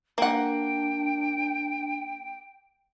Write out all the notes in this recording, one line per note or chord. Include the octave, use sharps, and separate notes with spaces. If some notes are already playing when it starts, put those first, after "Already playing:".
A#3 D4 F#5 G5